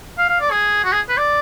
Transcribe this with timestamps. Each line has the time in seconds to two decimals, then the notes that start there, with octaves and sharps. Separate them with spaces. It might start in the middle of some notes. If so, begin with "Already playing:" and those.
0.18 F5
0.29 F5
0.40 D5
0.51 G#4
0.84 F#4
0.92 G#4
1.09 B4
1.17 D5